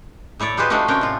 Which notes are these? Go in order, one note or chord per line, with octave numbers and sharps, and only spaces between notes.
A2 E4 C#5 D5
D#4 F4 G4 G#4 B4 C5
G3 A3 D4 D#4 F4 F#4
C3 C#4 D4 F4 A#4 G5
A2 F4